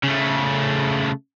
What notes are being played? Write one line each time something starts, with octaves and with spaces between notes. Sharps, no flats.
C#3 A3